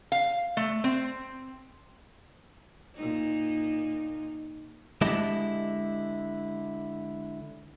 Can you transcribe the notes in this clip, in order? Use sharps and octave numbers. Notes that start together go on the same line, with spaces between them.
F5
A3
C4
A#2 D#4
D3 G#3 E4 G4 D#5 A5